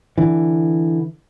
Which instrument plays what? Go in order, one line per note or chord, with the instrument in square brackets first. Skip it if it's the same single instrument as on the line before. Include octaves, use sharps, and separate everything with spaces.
[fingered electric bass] D3 E3